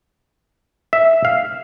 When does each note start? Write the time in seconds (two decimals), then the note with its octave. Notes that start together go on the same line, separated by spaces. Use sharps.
0.93 E5
1.25 F5